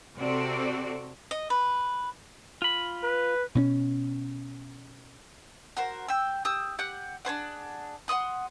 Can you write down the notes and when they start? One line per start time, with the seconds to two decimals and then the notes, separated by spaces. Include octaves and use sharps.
0.18 C3 C4 F#4 A4 D5
1.31 D#5
1.50 B4
2.62 F4 B5
3.03 B4
3.55 B2 C4 C#4
5.77 F#4 A#4 C5
6.08 G5 E6
6.45 G4 D#6 E6
6.79 G4 F#5 F#6
7.25 D4 G#4 C5 F#5
8.08 F#5 C6 D#6 F#6